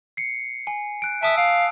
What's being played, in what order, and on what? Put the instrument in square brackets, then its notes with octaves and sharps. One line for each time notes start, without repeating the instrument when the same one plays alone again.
[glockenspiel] C7 C#7
G#5
F#6 D7
[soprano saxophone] E5 [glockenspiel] A5 D#6 E6
[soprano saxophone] F5 [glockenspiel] D7